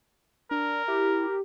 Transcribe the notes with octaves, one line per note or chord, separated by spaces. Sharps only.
D4 A#4
E4 G4